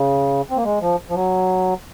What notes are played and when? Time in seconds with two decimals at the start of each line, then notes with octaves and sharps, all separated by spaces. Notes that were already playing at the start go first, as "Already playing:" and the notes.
Already playing: C#3
0.50 C4
0.57 A#3
0.64 G#3
0.81 F3
1.10 F3
1.14 F#3